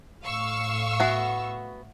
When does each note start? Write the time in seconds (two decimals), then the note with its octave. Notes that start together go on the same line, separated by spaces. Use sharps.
0.23 A2 F5 C#6 E6
1.00 B3 F#4 E5 F#5 G#5